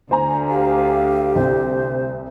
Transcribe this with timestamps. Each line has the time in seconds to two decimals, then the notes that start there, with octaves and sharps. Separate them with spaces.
0.11 D2 C5 G#5 A#5
0.49 G4 F5
1.36 C2 C5